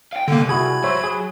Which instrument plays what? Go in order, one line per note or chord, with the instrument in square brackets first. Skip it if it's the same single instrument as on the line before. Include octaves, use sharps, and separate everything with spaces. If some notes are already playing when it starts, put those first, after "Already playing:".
[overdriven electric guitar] F5 G5
[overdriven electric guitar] C2 A#2 [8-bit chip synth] D3 A#3
[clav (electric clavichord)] E4 F#4 G#4 [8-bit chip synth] B5 G#6
[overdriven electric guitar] F#3 [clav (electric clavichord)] C5 C#5 E5
[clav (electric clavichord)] G#4